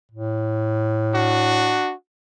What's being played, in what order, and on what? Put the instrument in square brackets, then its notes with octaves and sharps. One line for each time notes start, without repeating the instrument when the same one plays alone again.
[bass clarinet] A2
[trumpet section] D4 F#4